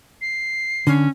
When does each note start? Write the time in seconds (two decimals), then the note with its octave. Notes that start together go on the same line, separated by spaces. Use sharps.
0.21 C7
0.87 D3 C#4